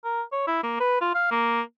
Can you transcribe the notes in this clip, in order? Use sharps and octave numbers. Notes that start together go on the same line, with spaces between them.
A#4
C#5
E4
A#3
B4
F4
F5
A#3